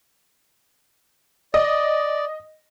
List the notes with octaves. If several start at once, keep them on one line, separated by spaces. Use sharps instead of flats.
D5 D#5